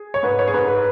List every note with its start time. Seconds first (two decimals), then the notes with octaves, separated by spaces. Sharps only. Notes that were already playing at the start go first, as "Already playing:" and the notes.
Already playing: G#4
0.14 C#5
0.23 G#2 B4
0.39 C#5
0.47 G#4
0.53 G#2 B4
0.68 B4